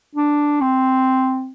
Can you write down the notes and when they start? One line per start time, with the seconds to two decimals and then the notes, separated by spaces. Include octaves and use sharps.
0.15 D4
0.61 C4